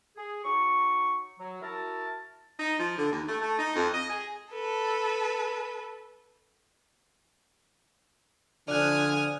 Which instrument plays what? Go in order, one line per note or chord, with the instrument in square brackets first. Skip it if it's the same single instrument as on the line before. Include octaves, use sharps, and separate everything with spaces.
[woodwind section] G#4
F#3 D#4 C#6
F#3
E4 F#4 A#4 A5
[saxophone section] D#4
F3
D3
D#2
A3
A3
D#4
F2
D#5
G#4
[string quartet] A4 B4
[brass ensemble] D3 F3 [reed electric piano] D5 F#6 [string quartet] G#5 D#6 F6